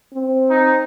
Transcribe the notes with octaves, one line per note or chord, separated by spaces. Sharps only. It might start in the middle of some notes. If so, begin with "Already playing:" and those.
C4
D#4